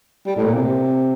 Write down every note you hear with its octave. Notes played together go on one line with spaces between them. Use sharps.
G3
A2
A#2
C3